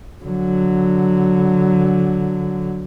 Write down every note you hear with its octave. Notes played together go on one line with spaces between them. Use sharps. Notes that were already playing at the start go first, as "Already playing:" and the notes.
D3 F#3